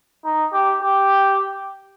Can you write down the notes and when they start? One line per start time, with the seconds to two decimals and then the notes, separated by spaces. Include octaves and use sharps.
0.25 D#4
0.53 G4
0.82 G4